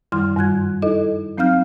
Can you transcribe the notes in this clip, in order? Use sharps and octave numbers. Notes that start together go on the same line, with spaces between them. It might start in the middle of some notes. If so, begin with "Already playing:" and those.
F#2 D#3 G3 E4 C6 F6
G2 G3 F#6 G#6
D#4 E4 A4 D#5
F#3 C4 D#4 F5 F6 G6